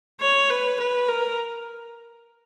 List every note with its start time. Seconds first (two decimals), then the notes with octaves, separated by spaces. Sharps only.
0.21 C#5
0.50 B4
0.79 B4
1.09 A#4